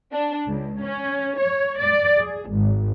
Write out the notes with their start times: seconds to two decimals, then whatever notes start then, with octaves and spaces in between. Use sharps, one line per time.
0.12 D4
0.47 C#2
0.82 C#4
1.38 C#5
1.78 D5
2.19 G#4
2.51 G#1